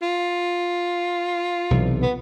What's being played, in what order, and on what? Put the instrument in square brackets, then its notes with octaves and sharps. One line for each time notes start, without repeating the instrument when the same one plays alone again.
[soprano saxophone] F4
[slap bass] B1 C3 E3
[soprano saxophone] B3